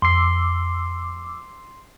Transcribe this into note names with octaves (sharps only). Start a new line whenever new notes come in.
F2 C6 D6 E6 C7